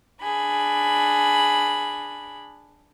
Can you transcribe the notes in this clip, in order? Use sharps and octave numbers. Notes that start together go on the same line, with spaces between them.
D4 G#4 B5